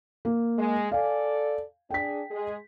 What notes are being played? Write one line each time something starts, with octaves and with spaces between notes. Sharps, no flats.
A#3
G#3
A4 D5 F5 G#5
D4 G#4 G5 B6
G#3 G#4